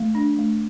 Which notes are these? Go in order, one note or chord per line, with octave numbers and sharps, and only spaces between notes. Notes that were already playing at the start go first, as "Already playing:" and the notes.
Already playing: A3
D4
A3